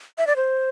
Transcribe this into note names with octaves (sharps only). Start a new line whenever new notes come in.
E5
D5
C5